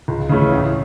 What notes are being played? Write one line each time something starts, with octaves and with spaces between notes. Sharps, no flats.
C#2
C#3 E3 A3 C#4
A1